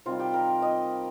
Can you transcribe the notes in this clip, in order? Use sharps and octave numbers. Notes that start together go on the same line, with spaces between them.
C3 D#3 G3 F4
G4
A#4
D#5